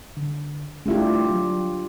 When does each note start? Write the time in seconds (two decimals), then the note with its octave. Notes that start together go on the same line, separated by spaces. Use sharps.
0.17 D3
0.86 G#3 A3 D4 E4 F4 G4
1.30 F#3